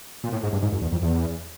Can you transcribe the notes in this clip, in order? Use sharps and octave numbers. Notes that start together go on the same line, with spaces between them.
A#2
A2
G#2
G2
G#2
F#2
E2
F2
E2